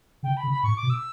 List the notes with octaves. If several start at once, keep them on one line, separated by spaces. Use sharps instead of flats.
C#3 G5
B5
C#3
B5
A2 C#6
D6
B2
E6